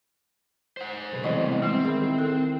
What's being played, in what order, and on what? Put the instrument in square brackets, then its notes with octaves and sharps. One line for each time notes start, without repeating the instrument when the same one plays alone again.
[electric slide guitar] C5 F#5
[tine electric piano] B1 C#3 B4
[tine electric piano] A2 G3 B3 [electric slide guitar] C3 G#3 C4 [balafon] E3 D#5
[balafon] G#3 [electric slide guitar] C4
[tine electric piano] D#3 E4 A#4 [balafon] G#4
[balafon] A4